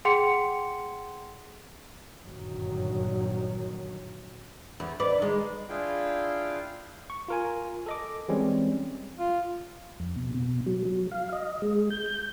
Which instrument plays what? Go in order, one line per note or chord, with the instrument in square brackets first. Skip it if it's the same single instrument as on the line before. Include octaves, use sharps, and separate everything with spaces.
[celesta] G#4 F#5 G5 C6 C#7
[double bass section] G1 F#2 A#2 D#3 F#3
[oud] E2
B4 D5
D#3 G#3
[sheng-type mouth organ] D4 E4 F4 G#4 F5 G5
[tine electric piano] C#6
F4 A#4 G#5
A4 D#5 D6
E3 G3 G#3 C4 C#4
[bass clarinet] F4
[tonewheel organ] F2
B2
B2
F#3
F#3
F5
D#5
G#3
G6
G6